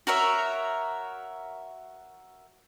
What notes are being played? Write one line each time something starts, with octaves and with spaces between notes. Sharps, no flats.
F#4 A#4 C#5 E5